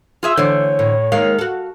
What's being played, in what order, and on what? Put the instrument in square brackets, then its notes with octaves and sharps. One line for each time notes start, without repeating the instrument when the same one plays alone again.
[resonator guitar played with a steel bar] F4 G#4 E5
[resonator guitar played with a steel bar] D3 E3 C5 [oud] A3 [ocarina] C#5
[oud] A2
[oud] D#3 G#3 A#3 [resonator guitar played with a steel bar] F5
[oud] F#4 A4